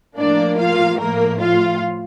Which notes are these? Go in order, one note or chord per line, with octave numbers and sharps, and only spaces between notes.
A2 F3 A#3 D4 D5
F4 F5
A2 F3 A3 A#3 A#4
F4 F5